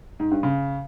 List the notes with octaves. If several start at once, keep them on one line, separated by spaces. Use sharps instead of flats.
G#2
G2
C#3